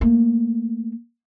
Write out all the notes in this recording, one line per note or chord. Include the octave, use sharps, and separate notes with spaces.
A3 A#3